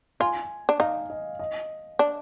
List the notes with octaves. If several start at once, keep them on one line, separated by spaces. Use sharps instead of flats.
F4 G#5
D4
D#4 F5
D#5
D#5
D4